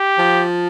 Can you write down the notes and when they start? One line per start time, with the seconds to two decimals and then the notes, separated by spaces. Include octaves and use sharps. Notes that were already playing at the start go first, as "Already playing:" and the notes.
Already playing: G4
0.19 F3